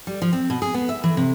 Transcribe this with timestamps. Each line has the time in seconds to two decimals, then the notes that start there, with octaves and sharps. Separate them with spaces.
0.07 G3
0.22 F3
0.33 C4
0.50 B2
0.62 G#4
0.74 B3
0.89 E5
1.04 E3
1.17 C3